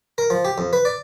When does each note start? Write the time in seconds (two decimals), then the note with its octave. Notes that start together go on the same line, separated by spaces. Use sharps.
0.18 A#4
0.30 F3
0.45 G4
0.58 F2
0.73 B4
0.85 D5